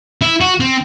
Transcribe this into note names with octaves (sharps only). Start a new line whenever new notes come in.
E4
F#4
C4